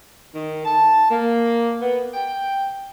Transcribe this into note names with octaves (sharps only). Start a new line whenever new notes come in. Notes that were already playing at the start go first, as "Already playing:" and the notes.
D#3
A5
A#3
B3
G5